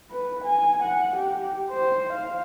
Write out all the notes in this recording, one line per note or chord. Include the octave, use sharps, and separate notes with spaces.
B4
G#5
F#5
G4
C5
F5